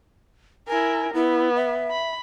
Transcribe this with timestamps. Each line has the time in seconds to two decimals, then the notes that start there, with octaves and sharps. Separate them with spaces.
0.68 E4 A#4 G#5
1.14 B3 E4
1.56 E5
1.91 B5